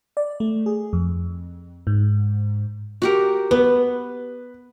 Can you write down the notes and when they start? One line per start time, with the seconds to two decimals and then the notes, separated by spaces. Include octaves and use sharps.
0.17 D5
0.40 A3
0.66 G#4
0.93 F2
1.87 G#2
3.02 F#4 G4 A#4
3.51 B3 B4